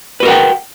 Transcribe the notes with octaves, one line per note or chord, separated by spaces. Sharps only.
F#4 A#4 B4 F#5 G5